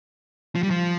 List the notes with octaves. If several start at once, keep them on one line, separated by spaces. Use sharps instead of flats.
F3
G3
F3